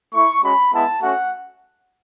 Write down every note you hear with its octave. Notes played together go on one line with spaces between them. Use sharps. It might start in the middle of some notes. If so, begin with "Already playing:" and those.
A3 E4 C#6
G#3 C#4 F#4 B5
G#3 B3 E4 A5
A3 C#4 F#4 F#5